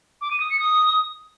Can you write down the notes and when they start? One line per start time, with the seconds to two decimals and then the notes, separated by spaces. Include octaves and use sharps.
0.21 D6
0.30 D#7
0.40 D#6
0.49 C#7
0.59 D#6